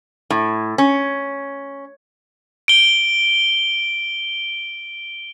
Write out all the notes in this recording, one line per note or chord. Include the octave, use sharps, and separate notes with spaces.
A2
C#4
D7 G7